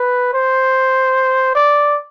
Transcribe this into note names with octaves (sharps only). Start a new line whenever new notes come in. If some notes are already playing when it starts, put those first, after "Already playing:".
Already playing: B4
C5
D5